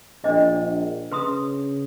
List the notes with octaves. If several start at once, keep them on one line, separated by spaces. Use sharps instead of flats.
A#1 D4 C5 D#5
C#3 B4 C6 D#6